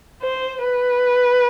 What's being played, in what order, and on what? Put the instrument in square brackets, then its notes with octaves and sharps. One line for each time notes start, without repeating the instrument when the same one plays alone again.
[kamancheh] C5
B4